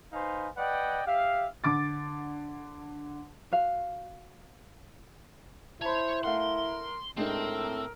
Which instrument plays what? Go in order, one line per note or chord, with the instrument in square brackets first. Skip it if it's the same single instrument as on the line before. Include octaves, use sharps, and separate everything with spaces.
[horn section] D#4 B4 C5 F5 G#5
B4 D5 D#5 F#5 G5
G4 E5 F5
[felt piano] D3 D6 A6
[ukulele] F#4 F5
[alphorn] E4 [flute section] C5 [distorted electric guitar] C#5 [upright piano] A5 B5
[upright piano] A3 F5 F#5 [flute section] A#4 [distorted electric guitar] C6
[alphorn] A2 [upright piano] G#3 D4 D#4 [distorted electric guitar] C4 [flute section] A#4 E6